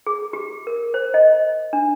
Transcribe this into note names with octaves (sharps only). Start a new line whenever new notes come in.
G#4
G4
A#4
C5
D#5
D4